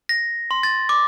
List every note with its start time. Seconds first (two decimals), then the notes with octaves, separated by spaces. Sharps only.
0.09 A#6
0.51 C6
0.63 A6
0.89 D6